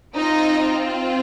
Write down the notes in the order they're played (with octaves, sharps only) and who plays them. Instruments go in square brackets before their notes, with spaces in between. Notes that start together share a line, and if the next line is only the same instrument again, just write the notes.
[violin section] C4 D#4 F4 D#5